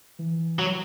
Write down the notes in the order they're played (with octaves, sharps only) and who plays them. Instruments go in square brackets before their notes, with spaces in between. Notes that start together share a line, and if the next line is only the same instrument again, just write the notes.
[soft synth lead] E3
[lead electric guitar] F#3